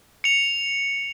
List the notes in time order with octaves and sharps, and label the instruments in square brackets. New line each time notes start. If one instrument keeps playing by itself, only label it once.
[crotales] C#7 F7